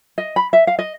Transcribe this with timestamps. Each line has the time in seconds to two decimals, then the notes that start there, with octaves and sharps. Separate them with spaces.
0.18 D#5
0.36 B5
0.53 E5
0.67 F5
0.79 D#5